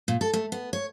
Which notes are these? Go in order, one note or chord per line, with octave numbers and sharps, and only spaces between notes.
A#2
A4
A3
B3
C#5